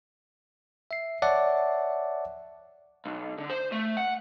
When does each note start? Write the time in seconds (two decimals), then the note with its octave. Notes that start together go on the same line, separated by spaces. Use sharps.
0.91 E5 C7
1.22 C#5 D5 E5 F#5 A5
3.06 B1
3.38 D3
3.50 C5
3.72 A3
3.97 F#5